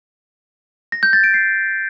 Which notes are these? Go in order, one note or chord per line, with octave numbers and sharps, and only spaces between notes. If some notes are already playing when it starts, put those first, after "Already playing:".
A#6
G6
A6
D7
C7